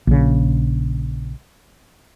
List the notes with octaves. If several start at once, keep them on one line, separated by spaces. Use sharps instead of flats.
A#1 C#3